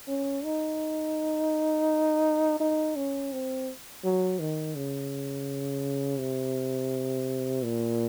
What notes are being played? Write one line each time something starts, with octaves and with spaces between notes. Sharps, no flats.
C#4
D#4
D#4
C#4
C4
F#3
D#3
C#3
C3
A#2